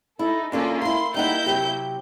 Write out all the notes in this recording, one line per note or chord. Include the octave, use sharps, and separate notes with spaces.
D#4 E4 A4
D2 A#3 C#4 D4 F4 A4
A#3 E4 C6
G3 A#3 D#4 E4 F#5 G6
C3 F#3 G4